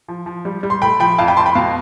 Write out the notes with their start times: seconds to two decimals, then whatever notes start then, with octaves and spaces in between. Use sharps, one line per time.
0.08 F3
0.26 F3
0.45 G3
0.63 G3
0.70 C6
0.82 A3 G5 B5
1.00 F3 G5 B5
1.18 F2 F5 A5
1.28 G5 B5
1.37 F2 A5 C6
1.46 G5 B5
1.55 B2 F5 A5